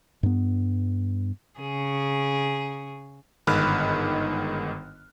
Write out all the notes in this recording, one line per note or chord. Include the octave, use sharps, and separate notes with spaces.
G2 B3
C#3 G#4
G1 G#2 D#3 B5 F6 F#6